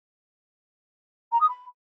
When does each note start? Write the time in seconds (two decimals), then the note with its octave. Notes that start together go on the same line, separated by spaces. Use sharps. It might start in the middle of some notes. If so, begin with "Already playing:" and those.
1.32 A#5
1.40 D#6
1.49 B5